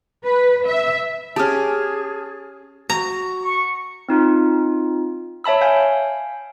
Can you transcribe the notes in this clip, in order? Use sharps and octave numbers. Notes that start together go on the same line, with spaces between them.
B4
E5
C#4 G4 G#4 A5 D#6 F6
F#4 A#5
C#6
C4 D#4 F4
C#5 E5 A5 B5 E6
F5 G#5 G6 D7